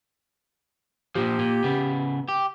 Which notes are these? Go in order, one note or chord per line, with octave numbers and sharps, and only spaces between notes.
A#2 F3 G4
A#2
C#3 B3
G4